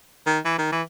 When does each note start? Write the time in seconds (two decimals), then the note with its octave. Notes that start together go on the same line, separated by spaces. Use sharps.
0.27 D#3
0.45 E3
0.58 D#3
0.72 E3